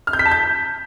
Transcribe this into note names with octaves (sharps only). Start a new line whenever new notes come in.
F6
G6
B6
A5
G6